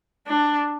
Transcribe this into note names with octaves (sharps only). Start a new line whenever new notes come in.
D4